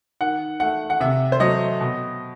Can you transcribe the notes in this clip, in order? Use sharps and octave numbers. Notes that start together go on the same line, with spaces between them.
D#3 F#5
A3 F#5
F#5
C3 E5
C5
F#3 A3 D#5
B2